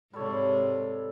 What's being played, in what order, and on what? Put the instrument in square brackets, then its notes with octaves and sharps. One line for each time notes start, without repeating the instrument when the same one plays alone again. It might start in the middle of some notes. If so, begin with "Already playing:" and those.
[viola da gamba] G#2 C3 [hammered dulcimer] G3 A4 C#5